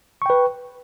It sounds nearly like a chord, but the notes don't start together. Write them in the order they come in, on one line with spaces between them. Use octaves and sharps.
C#6 G5 B4